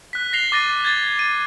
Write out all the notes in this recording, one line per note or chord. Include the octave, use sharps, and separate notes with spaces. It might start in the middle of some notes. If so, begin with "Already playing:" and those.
F#6 B6
A#6 C7 F7 G7
D6 A6 A#6 D#7
G#6 A6
A6 D#7